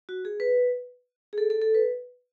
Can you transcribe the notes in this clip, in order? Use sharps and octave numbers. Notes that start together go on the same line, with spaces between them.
F#4
G#4
B4
G#4
A4
A4
A4
B4